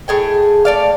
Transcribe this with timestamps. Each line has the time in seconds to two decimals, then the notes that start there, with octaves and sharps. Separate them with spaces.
0.08 A2 G#4 G5
0.65 A3 D5 F5